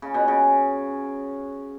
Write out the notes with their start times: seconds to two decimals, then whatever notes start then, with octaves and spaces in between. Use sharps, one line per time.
0.02 C#3
0.14 B2
0.28 C#3